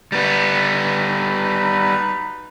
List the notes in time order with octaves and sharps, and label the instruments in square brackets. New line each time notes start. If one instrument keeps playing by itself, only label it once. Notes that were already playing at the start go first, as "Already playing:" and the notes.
[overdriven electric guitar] G3 B3 [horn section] D#4 F#4 B4